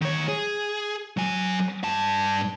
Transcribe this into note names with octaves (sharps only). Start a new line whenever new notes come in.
D#3 C#5
G#4
F#3 G#5
G2 A5